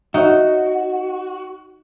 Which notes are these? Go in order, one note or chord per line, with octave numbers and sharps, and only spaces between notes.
D#4 F#4 C#5 E5 F#5